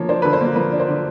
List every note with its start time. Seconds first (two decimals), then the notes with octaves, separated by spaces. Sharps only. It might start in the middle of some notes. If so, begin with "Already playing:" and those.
Already playing: D3 F3 A#3 C#5
0.09 D4 C5
0.22 D3 B4
0.33 C5
0.41 A#3
0.56 F3 B4
0.72 D4
0.80 C5
0.88 D3